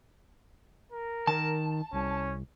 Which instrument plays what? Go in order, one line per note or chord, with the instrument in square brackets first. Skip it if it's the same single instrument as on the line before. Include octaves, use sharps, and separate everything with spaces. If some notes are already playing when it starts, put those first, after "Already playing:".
[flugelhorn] A#4
[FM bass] D#3 [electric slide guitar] A5
[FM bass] C2 [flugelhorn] C#4